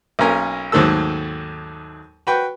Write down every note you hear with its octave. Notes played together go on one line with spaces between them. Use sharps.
B1 A#3 C#4 A#4 G#5
D#2 G#2 F#3 A3 A4 E6
F#4 B4 G5